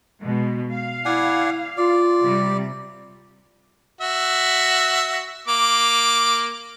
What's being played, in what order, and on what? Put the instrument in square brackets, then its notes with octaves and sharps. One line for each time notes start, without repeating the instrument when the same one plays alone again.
[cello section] B2 G#3
F5
[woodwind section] E4 [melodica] D5 F#5 G#5
[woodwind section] F4 [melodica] D5
[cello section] C3 G3
[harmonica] F#4 E5
A#3 D6